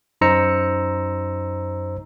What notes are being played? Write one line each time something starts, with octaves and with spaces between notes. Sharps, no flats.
F#2 D#4 C5 A#5 E6 C#7